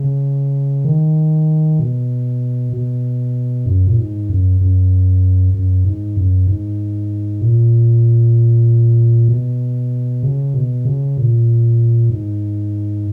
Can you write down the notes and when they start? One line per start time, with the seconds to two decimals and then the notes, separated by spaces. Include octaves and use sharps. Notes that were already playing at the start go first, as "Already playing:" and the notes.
Already playing: C#3
0.85 D#3
1.79 B2
2.73 B2
3.66 F#2
3.87 A#2
3.97 G#2
4.30 F#2
4.61 F#2
5.54 F#2
5.85 G#2
6.17 F#2
6.47 G#2
7.41 A#2
9.29 B2
10.23 C#3
10.54 B2
10.85 C#3
11.17 A#2
12.10 G#2